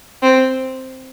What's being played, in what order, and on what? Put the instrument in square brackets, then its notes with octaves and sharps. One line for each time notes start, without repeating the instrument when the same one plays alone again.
[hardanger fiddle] C4